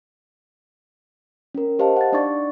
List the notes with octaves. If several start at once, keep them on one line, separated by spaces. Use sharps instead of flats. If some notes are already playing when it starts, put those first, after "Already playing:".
C#4 A#4
G4 C5 D#5 F5 A5
F#5 A6
D4 D#4 D5 F#5 C#6 A6